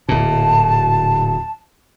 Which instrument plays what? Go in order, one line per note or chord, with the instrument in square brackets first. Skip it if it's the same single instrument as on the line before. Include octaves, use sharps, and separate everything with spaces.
[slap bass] D1 A#2 [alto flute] A5